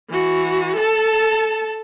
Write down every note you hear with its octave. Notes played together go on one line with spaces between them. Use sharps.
E3 F#4
A4 A5